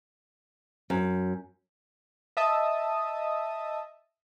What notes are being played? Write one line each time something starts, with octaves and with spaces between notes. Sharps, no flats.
F#2
D#5 E5 A5 D#6